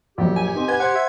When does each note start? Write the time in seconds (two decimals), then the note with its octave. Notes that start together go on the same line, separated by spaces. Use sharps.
0.18 A#1 F#2 G4
0.36 G#5
0.54 C4 D#4
0.68 B4 F#5 G#6
0.80 C5 F#5 C6
0.95 E5